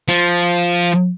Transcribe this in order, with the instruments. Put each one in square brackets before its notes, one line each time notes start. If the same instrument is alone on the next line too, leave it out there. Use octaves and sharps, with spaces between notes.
[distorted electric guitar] F3